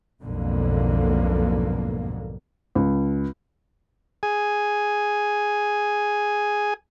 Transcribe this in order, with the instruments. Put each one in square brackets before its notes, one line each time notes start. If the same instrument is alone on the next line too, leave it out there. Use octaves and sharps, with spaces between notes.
[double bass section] B1 F2 G#2 B2 D3 A#3
[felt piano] C#2
[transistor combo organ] G#4 G#5